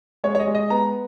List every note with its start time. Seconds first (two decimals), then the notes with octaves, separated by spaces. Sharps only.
0.24 G#3 C#5
0.35 C#5
0.39 D#5
0.47 G#3
0.55 D#5
0.70 B3 A#5